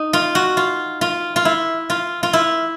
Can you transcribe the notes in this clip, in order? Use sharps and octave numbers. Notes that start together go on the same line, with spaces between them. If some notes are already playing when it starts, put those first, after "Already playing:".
Already playing: D#4
F4
F#4
F4
F4
F4
E4
F4
F4
E4